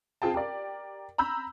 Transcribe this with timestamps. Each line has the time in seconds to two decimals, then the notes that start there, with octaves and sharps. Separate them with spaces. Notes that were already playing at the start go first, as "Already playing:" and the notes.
0.22 C4 F4 G#4 G5 A5
0.34 G4 A#4 D5
1.18 A#5 B5 E6 G6